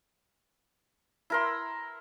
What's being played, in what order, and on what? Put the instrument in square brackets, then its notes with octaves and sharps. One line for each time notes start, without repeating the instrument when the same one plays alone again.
[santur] E4 A#4 C6